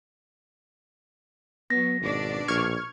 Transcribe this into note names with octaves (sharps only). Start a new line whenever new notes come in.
F#3 B3 A#6
G#1 B2 D4 D5
A#1 C#6 F6 G#6